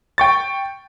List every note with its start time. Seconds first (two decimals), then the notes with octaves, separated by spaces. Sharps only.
0.18 G5 C#6 A6